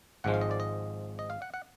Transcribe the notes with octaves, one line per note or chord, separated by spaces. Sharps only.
G#1 G#2 F3 G#3 F#5
F5
D#5
D5
D#5
D#5
F5
F#5
F#5